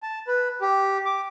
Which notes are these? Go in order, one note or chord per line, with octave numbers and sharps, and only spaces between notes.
A5
B4
G4
D6